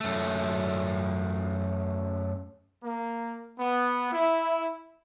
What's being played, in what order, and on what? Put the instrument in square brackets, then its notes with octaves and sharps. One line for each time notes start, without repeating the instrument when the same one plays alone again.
[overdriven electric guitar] F#2 A3
[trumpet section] A#3
B3
E4